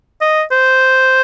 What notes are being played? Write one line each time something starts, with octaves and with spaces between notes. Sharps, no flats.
D#5
C5